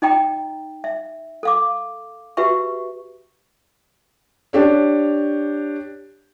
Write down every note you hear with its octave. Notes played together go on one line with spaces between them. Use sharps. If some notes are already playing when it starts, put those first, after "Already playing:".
D#4 D#5 G5 A#5
E5
A4 F5 D6
F#4 G4 B4 E5 C#6
D4 G4 C#5